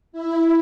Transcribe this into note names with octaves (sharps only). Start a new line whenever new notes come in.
E4